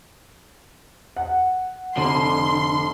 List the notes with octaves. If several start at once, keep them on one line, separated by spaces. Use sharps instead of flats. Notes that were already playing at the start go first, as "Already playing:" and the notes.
F#5
F1 D3 C6